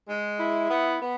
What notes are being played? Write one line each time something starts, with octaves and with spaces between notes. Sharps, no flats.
G#3
E4
B3
B3